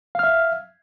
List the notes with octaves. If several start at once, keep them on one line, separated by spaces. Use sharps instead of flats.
E5 F5 F6